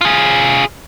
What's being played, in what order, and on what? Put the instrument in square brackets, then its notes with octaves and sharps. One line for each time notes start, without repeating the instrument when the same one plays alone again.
[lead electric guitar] F4 G#4